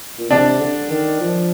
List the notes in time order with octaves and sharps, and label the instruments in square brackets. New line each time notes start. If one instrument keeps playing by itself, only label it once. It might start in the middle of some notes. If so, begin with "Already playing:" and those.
[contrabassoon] A#2
[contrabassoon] C3 [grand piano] D4
[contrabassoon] D3
D#3
F3